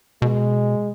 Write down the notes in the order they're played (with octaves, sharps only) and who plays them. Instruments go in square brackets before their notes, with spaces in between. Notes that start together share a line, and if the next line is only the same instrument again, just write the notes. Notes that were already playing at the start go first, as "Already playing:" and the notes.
[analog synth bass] B2 [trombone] G#3